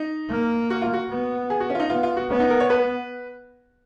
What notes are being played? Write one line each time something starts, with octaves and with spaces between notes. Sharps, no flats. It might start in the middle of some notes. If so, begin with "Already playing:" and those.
Already playing: D#4
A#3
F#4
F4
F#4
B3
G#4
F#4
C#4
F4
D#4
B3 F4
F4
F#4
B3 C#4
D#4
A#4
C#5
B4